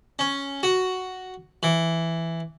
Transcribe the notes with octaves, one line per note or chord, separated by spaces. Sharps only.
C#4
F#4
E3